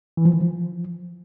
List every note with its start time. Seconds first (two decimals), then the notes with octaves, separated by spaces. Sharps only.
0.17 E3
0.25 F3
0.33 D#3
0.41 F3